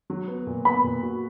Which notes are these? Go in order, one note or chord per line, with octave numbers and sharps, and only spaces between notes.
F#3
B3
A#2
B3 B5
A#2
F#4